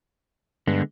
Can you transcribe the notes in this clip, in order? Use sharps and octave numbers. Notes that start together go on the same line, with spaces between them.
G2 D3 G#3 B3